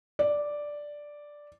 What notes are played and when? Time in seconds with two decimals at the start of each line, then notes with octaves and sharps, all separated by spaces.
0.19 D5